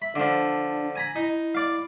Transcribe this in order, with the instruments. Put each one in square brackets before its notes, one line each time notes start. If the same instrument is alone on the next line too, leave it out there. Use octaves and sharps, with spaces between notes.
[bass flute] E5 [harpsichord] B5
[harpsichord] D3 F3 [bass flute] D4
[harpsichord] G#5 A#5 B5
[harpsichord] D#4 [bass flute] E4
[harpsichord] D5 F5